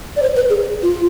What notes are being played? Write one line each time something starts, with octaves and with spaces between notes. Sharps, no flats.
D5
C5
B4
G#4
F4